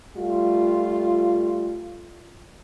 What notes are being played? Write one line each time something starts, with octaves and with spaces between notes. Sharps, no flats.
G3 A3 F4